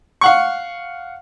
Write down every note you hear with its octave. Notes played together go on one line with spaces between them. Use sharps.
F5 F#5 C#6